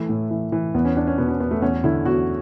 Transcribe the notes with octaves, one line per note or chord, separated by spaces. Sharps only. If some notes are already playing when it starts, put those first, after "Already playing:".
Already playing: E3 A3
A2
E3
E3
E2 B3
C#4
E2 D4
C#4
B2 B3
C#4
E2 B3
A3
E2 C#4
D3 E4
E2 F#4